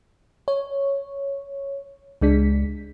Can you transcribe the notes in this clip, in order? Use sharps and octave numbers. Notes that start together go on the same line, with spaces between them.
C#5
C#2 G#3 D4 B6